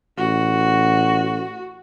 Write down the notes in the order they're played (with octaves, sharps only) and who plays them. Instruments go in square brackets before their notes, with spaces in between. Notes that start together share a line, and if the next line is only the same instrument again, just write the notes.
[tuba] A1 [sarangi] F#4